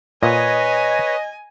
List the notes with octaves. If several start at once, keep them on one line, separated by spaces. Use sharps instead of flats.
A#2 B4 C#5 D#5 G#5